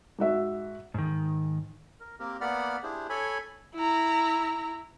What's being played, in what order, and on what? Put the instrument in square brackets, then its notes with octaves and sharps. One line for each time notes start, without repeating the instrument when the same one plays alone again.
[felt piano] G#2 F#4 E5
[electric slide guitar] G#2 D#3
[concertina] A#4
A#3 C4 G4 A#4
A#3 B3 D5 F#5 B5 F6
D4 E4 G4 G#4 C5
A4 C#5 G#5 B5
[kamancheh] E4 A#5